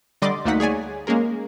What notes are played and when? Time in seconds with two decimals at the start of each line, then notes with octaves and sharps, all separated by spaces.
0.22 D3 G3 D5 D#5 C6 D6
0.45 D2 A3 A#3 D#4 F#5 B6
0.60 G#4 C#5 D5 G#5
1.07 G#3 A#3 C#4 G#4 A#4